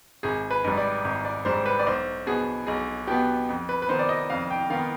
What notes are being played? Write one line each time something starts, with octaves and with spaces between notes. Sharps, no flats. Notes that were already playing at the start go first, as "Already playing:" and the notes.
G#1 G#4
B4
G#2 G3
D5
G#1
D5
G#2 G3 C5
B4
D5
B1 C5
B2 B3 G#4
B1 G#4
B2 B3 G4
F2
B4
B4
D#3 B3 C5
D5
D#5
F2 F5
G5
D#3 B3 F5